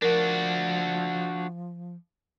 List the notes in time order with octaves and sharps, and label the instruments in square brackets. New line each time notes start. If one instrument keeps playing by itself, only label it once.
[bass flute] F3 [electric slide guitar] D4 F#4 [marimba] A#4